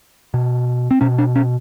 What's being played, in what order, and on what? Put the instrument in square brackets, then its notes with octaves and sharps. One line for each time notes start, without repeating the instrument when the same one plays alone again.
[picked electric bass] B2
C4
B2 C#4
D4
C#4